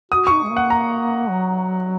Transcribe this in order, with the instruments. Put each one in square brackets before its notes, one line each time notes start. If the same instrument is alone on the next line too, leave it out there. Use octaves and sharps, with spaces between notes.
[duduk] F#4 [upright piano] D#6
[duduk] D#4 [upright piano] C#6
[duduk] G#3
A#3
[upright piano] F#5
A#5
[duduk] F#3